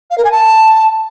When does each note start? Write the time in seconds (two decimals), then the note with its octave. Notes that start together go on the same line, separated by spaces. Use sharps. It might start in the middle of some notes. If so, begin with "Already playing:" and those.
0.11 F5
0.18 A#4
0.25 G#5
0.32 A5